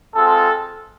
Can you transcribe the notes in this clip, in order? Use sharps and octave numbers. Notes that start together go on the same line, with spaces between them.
G#3 C4 F4 A4